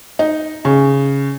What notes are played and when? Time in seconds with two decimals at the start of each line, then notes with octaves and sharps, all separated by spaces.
0.19 D#4
0.65 C#3